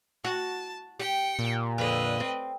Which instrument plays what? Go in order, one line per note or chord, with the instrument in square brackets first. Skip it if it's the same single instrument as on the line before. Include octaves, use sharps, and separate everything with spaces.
[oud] F#4 [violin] A5
[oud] G4 [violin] G5 C#7
[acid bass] A#2
[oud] F2 D3 [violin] B4 D#5
[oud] C4